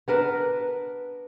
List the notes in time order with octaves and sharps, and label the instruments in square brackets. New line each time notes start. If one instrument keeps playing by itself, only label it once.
[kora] B3 D4 A#4 B4